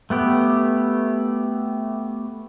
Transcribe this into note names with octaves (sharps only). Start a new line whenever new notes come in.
A3 B3 G4